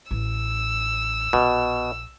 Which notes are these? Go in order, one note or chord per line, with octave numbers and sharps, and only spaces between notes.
A1 E6
A#1 B2